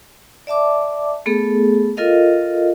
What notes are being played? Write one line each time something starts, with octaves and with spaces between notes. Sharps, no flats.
D5 E5 A5 D6
A3 B3 G#4 A4
F4 A4 A#4 D#5 F5